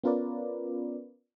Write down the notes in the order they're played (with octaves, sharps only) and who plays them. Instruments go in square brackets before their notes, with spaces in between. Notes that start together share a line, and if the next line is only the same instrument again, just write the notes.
[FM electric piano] B3 C#4 F4 A#4 B4 D5